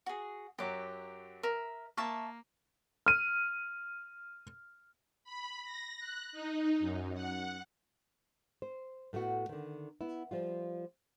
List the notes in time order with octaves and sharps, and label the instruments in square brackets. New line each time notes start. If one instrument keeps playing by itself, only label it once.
[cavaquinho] F#4 G#4
[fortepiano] F#2 F#3 [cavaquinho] G4 D6
[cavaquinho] A#4 E5
[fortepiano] A#3 [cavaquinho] E5 A5 C#6
[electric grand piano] F6 D#7
[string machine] B5
A#6
F#6
D#4
F#2
F#5
[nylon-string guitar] C5
A2 A3 B3 F#4
D3 D#3
B3 E4
F3 G3 F4